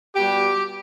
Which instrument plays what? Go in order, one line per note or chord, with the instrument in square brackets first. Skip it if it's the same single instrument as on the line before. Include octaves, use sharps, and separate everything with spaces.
[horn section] B2 G3 G4